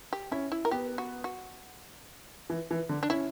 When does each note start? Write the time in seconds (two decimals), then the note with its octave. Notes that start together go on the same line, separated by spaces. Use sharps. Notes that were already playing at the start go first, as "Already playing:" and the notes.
0.13 G4
0.31 C#4 E4
0.52 E4
0.65 A#4
0.71 B3 G4
0.98 F#4
1.24 F#4
2.50 E3
2.71 E3
2.89 D3
3.03 D4
3.10 C#4 E4